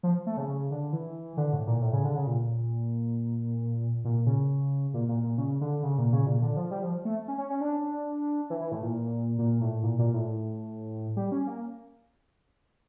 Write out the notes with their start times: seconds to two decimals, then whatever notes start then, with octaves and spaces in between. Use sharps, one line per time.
0.03 F3
0.26 A3
0.37 C#3
0.48 C#3
0.71 D3
0.93 E3
1.37 D3
1.53 A2
1.67 A#2
1.82 A2
1.93 C#3
2.04 D3
2.16 C#3
2.27 A#2
4.04 A#2
4.26 C#3
4.94 A#2
5.09 A#2
5.23 A#2
5.38 C#3
5.61 D3
5.83 C#3
5.98 A#2
6.13 C#3
6.27 A#2
6.42 D3
6.57 F3
6.71 G3
6.83 F3
7.05 A3
7.28 C#4
7.38 C#4
7.50 C#4
7.61 D4
8.50 E3
8.61 E3
8.72 A2
8.83 A#2
9.38 A#2
9.61 A2
9.83 A#2
9.99 A#2
10.14 A2
11.16 G3
11.32 C#4
11.47 A#3